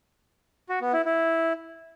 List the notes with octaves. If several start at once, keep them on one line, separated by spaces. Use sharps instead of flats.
F#4
B3
E4
E4